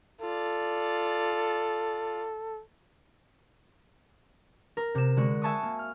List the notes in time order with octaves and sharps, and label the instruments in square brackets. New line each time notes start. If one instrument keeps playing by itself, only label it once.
[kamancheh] F4 D5 [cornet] A4
[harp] A#4
C3 E7
D3 G#3 F#4
E5 G#5 A5 B5 C#6 D#6
A#3
F6